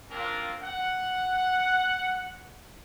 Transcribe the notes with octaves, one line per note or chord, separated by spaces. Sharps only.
A#3 C4 D4 F4 A#4
F#5